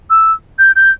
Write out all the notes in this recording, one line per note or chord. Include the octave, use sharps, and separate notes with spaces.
E6
G6
G6